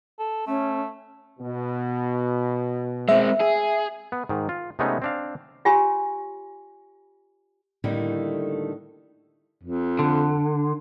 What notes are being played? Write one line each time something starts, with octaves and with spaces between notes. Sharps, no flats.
A4
A3 C#4
B2
G#3 C4 E5
G#4
B3
G#2 D#3
F4
C3 G#3 A3 B3 C#4 D#4
C4 D4 F5
F4 G4 C#5 G#5 C6 C#6
A2 D3 D#3 G3 A3 A#3
F2
D3